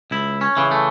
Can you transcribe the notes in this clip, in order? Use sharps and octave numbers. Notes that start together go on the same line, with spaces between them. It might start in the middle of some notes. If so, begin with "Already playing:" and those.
C#2 E4
C#4
C#3 E3
A3